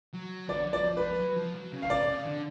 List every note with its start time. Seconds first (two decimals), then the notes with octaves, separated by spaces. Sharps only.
0.14 F#3
0.49 D3 D5
0.67 F#3
0.73 D5
0.84 F3
0.97 B4
1.02 F3
1.20 F#3
1.37 F3
1.55 F#3
1.73 C#3
1.82 D3 F5
1.90 C#3 D5
2.08 C#3
2.26 D3